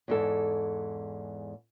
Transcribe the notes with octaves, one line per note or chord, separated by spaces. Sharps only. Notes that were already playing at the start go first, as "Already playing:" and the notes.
E2 G#2 A4